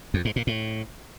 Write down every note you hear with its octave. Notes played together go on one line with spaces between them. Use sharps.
F2
G#2
A#2
A2